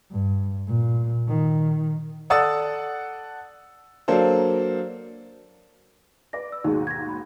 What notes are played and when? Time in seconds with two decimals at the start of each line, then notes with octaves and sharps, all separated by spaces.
0.11 G2
0.67 A#2
1.28 D#3
2.30 A4 D5 F#5 D#6 E6 A6
4.08 F#3 A#3 D4 A4 C5
6.33 B4 D5 D6 A#6
6.52 E6
6.64 D#2 G#2 B2 D#4 G#4
6.87 G#6 A#6
7.09 B5